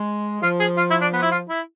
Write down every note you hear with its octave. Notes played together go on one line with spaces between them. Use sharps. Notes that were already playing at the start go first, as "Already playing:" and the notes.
Already playing: G#3
F3 F4
G#4
F4
E4
D4
B3
E4
F4
E4